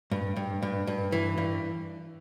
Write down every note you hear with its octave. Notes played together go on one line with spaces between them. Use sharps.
G2
G2
G2
G2
E3
G2